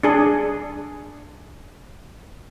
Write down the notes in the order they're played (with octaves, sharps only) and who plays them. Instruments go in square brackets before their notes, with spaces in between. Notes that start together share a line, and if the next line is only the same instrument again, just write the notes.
[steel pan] D4 G#4